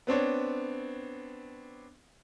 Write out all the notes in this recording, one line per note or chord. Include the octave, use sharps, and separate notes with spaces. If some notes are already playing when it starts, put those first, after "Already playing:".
B3 C4 D4 C#5